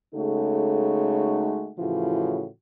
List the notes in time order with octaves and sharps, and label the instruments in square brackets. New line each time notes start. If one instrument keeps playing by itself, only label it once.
[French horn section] C#3 G#3 A3 D#4 F#4 A4
A2 C#3 E3 F3 F#4